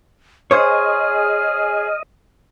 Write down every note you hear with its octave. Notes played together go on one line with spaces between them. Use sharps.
G#4 C5 C#5 D#5 F6